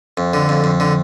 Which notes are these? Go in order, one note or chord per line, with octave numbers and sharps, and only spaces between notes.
F2
D3
F2
F2
D3